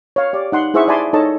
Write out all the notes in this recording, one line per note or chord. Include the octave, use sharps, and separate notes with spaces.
C#5 F5
G4 D5
D#4 F#5 C6
E4 G#4 C5 E5 F#5 C#6
D5 E5 G#5 A5 B5 C6
D#4 A4 C#5 D#5 A5